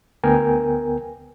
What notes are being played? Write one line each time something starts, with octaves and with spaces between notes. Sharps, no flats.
D2 B3 A#4 G5 G#5